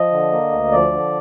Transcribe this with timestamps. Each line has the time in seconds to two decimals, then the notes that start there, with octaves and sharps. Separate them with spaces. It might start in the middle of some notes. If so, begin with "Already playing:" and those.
Already playing: F3 D#5
0.11 D3
0.32 A#3
0.51 D2
0.72 F3 D5
0.92 D3